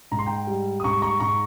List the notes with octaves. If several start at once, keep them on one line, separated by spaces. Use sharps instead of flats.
G#2 A#5
C6
G5 A#5
G3
D#6
G#2 A#5 C#6
A#5 C#6
G#2 A#5 C#6